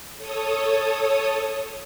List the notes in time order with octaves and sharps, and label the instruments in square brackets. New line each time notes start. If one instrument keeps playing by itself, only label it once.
[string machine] A4 C#5 D#6